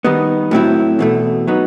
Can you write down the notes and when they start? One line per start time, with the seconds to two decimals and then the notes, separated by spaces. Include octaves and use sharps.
0.05 D#3 G3 B3 D#4
0.51 A2 F#3 C4 E4
0.99 E2 B2 A3
1.47 F#3 B3 D#4